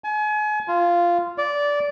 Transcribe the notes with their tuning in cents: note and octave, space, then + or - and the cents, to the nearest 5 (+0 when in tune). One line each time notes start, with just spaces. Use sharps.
G#5 +35
F4 -10
D5 -15